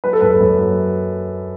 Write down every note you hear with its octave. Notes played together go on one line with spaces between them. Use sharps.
F#3 B4
A4
F#2 B4
A4
F#2
F#3